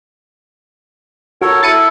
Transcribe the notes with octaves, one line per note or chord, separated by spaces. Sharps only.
F#4 A4 A#4 C#5
E4 A4 A6 C#7 D#7